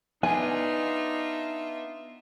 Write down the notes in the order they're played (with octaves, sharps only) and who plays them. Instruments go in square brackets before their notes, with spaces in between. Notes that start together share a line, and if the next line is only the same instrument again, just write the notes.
[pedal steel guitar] B3 D4 [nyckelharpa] D#4 [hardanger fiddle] F4 E5 [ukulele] G#5